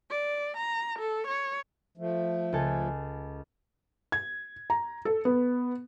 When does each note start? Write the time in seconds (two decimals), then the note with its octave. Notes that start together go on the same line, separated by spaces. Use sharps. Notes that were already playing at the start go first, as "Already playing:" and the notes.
0.10 D5
0.57 A#5
0.99 A4
1.27 C#5
1.98 F3 A3
2.53 C#2 A4 G#5
4.12 G#6
4.70 A#5
5.05 A4
5.25 B3